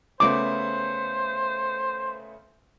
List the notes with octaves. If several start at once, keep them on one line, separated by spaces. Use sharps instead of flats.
C#3 A3 B3 C5 D6